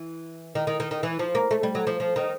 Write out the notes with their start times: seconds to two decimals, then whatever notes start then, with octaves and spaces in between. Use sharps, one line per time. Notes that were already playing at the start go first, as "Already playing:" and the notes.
Already playing: E3
0.55 D#3
0.67 D#3
0.80 D#3
0.91 D#3
1.03 E3
1.19 F3
1.35 A#3
1.51 A3
1.63 G3
1.75 F#3
1.87 F3
2.00 F3
2.16 D#3